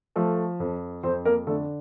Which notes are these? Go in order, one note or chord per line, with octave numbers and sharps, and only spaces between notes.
F3 A3 A4
F2
F2 C4 C5
A#3 A#4
D3 A3 A4